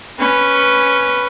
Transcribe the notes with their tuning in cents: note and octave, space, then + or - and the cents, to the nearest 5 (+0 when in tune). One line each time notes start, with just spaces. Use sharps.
C#4 +0 B4 +0